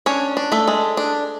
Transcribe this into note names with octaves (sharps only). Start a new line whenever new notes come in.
C#4 D4 C#5
D4
A3 A4
G#3
D4